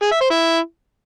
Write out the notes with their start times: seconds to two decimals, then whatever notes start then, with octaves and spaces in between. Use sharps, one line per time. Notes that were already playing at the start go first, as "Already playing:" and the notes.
0.02 G#4
0.11 E5
0.21 C5
0.30 E4